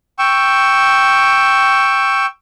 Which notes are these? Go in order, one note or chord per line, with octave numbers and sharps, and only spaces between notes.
G5 C#6 E6